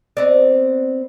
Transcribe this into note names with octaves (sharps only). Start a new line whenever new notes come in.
B3 C4 D5